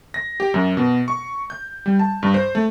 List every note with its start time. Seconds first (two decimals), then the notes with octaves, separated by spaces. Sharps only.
0.14 A#6
0.40 G4
0.54 F#2
0.77 B2
1.08 C#6
1.50 G6
1.86 G3
1.99 A5
2.23 G2
2.34 C5
2.55 A3